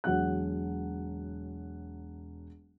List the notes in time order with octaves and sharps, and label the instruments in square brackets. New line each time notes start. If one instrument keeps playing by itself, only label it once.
[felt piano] E1 F#3 F#5 F#6